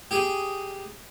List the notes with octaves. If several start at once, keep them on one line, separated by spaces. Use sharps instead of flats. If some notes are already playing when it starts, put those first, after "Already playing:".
G4 G#4